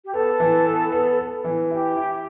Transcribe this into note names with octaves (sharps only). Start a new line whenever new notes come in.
G4
B3 A4
E3
B3
B3
B3
E3
E4 G4
E4